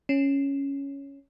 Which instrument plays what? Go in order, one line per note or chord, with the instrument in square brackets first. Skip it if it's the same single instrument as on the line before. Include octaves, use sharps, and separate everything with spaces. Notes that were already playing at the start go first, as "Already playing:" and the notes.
[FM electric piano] C#4